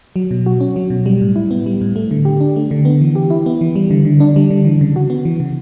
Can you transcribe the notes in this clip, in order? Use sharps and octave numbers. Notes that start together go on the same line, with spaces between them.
F#3
B2
F#4
C#4
F#3
B2
G3
A2
E4
B3
G3
A2
A3
D3
G4
D4
A3
D3
B3
E3
G4
E4
B3
E3
G3
D3
D3
D4
G3
D3
E3
C#3
F#4
B3
E3
C#3